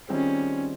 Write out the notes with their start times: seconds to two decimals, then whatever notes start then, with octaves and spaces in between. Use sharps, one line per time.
0.09 D#3 G3 C4 C#4 F4 G#4